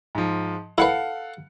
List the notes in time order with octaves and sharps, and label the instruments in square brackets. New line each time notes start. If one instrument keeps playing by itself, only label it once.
[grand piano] G#2 F3
[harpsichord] E4 B4 [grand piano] A4 F5 F#5